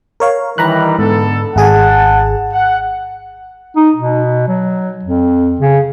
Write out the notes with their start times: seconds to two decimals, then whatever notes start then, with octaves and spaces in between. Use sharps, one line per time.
0.20 A#4 C#5 F5
0.58 D#3 E3 G3 A#5 B5 F#6
0.99 G#2 D3 B3 A4
1.56 G#1 G#4 F#5 G#5 A5
2.52 F#5
3.77 D#4
3.96 B2
4.48 F#3
5.05 F2
5.61 C#3